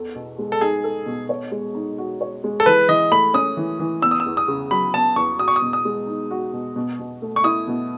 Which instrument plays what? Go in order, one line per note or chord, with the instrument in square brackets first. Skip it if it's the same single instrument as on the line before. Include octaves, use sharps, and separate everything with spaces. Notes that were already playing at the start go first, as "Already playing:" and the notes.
Already playing: [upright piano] E2 A4
B2
G#3
[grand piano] A4
[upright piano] D#4 [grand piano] G#4
[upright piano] A4
B2
C#5
G#3
D#4
F#4
C#5
G#3
[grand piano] A4
[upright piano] E3 [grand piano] B4
[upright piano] E3 [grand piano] D#5
[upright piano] A3 [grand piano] B5
[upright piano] C#4 [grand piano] D#6
[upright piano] E3
E3
[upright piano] B3 [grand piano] E6
[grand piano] D#6
E6
[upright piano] E2
[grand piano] D#6
[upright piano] C#3
[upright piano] F#3 [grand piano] B5
[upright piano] B3 [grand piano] A5
[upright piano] E2 [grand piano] C#6
[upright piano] F#4 [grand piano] D#6
[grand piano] C#6
D#6
[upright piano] B2
[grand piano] D#6
[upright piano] G#3
D#4
F#4
B2
B2
B2
A3
[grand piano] C#6
[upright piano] E4 [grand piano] D#6
[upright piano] B2